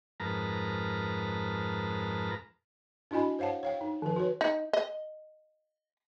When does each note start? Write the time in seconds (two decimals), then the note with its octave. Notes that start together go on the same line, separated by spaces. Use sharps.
0.20 F2 G#2 A#4 B4 A5 A#5
3.11 D4 E4 F#4 D#5 G#5 B5
3.39 C5 C#5 F5 F#5 A5
3.63 C#5 F5 G5
3.81 D#4
4.02 D#3 F3 B4
4.16 F#4 B4 C#5
4.41 D#4
4.73 D#5